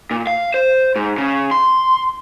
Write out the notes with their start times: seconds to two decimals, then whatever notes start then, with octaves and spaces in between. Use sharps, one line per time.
0.11 A#2
0.27 F5
0.54 C5
0.96 G#2
1.18 C#3
1.51 C6